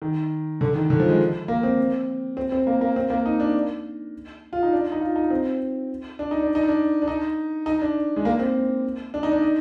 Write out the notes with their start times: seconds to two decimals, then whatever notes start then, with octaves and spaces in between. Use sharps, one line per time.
0.02 D#3
0.61 D3
0.75 D#3
0.90 D3
1.00 F3
1.09 G#3
1.48 A#3
1.63 C4
2.37 C4
2.52 C4
2.67 A#3
2.81 A#3
2.96 C4
3.10 A#3
3.26 D#4
3.40 D4
4.53 F4
4.63 D#4
4.73 D4
4.92 D#4
5.01 F4
5.16 D#4
5.30 C4
6.19 D4
6.31 D#4
6.43 D4
6.55 D#4
6.68 D4
7.02 D4
7.08 D#4
7.66 D#4
7.82 D4
8.16 G#3
8.25 A#3
8.40 C4
9.14 D4
9.23 D#4
9.32 D4
9.42 D#4